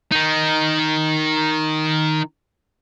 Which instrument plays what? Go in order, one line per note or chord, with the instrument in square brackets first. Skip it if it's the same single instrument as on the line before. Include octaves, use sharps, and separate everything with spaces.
[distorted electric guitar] D#3 D#4